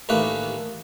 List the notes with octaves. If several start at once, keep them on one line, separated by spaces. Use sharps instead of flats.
A1 D#2 A3 A#3 B4